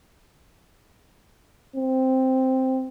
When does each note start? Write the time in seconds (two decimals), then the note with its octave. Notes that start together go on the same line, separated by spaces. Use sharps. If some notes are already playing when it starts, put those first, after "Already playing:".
1.76 C4